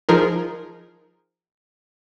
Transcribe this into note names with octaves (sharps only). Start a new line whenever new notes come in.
F3 D#4 F4 G#4 A#4